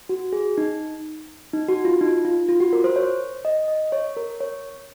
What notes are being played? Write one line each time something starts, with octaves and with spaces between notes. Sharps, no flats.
F#4
G#4
D#4
D#4
F#4
F4
D#4
F4
F4
F#4
A#4
C5
C#5
D#5
D#5
C#5
A#4
C#5